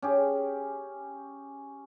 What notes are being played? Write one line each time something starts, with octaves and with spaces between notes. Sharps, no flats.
C#4 G4 G#4